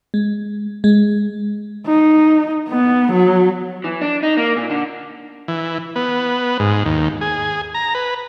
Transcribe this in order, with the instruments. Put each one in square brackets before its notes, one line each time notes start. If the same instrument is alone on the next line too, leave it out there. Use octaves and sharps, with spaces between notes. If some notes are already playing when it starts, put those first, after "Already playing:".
[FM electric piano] G#3
G#3
[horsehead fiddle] D#4
B3
F#3
[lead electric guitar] E3
D4
D#4
A#3
A#2
D3
[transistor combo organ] E3
B3
G#2
D#2
G#4
A#5
B4